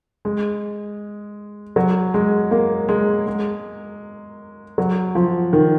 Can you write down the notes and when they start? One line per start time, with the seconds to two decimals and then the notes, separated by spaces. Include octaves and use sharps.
0.25 G#3
1.76 F#3
2.14 G#3
2.51 A#3
2.89 G#3
3.27 G#3
4.78 F#3
5.15 F3
5.53 D#3